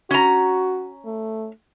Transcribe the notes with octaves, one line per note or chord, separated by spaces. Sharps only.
C#4 F#4 A#5
A3